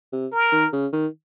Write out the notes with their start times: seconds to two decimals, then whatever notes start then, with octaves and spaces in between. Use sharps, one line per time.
0.13 C3
0.32 A#4
0.52 D#3
0.73 C#3
0.93 D#3